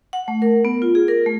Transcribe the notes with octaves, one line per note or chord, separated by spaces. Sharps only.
F#5
A3
A#4
B3
F4
G#4
A#4
A3